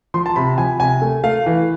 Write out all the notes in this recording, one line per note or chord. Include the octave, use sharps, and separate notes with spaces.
F3 C6
A5
C3 B5
F3 G#5
C3 G#5
A3
A3 F5
E3